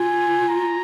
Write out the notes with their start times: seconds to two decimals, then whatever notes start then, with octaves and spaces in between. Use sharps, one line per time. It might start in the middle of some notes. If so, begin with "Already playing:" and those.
Already playing: F4 G#5
0.49 A#5